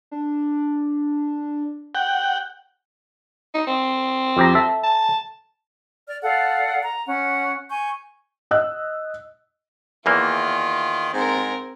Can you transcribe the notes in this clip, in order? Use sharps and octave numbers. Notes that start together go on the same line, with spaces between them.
D4
F#5 G5
D#4
C4
F2 G4 A#5
A4 E5
A5
D5 F6
A4 D5 F5 F#5
A#5
C#4 F#5
G#5 C#6 G6
D#5 E6 F#6
E2 D#3 E3 A#3 F4
G#2 C4 A#4